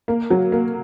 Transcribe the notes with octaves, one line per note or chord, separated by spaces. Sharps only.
A#3
F#3
A#3